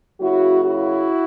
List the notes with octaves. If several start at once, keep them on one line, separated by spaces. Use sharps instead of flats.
C#3 F#3 A#3 E4 F#4
E4 F#4